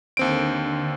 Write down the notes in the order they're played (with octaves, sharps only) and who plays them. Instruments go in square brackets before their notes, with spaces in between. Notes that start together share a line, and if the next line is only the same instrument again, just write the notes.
[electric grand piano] D#2 C4 D7 [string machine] D3